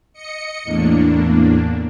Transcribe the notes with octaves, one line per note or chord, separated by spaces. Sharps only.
D#5 C#7
E2 A2 A#3 D4